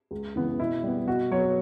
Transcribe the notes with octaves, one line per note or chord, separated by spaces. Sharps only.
C#2
C#3 E3 B3
B2 E4
G3 B3
B2 F#4
F#3 B3 C#5